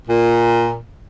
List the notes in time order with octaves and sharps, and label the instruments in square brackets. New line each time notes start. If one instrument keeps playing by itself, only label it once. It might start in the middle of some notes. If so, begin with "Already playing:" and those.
[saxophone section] A#2